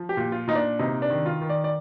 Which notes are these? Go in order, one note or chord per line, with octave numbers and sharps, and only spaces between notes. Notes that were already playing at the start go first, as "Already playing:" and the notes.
Already playing: F3
G4
A#2
F4
A#2 D#4
D4
C3 D#4
D4
D#3
F4
D#3
D5
D5